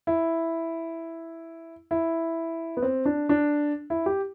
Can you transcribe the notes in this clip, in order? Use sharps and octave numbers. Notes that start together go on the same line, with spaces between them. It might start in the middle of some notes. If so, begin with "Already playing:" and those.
E4
E4
B3
C4
D4
D4
E4
G4